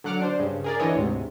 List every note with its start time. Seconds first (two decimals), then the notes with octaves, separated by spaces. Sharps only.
0.04 D3 F#3 F#5 D6 F6
0.22 D4 C5
0.39 G2 C#3
0.64 G#4 A#4 D5
0.79 D3 E3 C#5 D#5
0.94 D2 G#2 C3